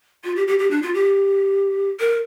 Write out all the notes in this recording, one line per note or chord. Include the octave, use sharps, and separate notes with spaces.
F4
G4
G4
G4
D4
F4
G4
A#4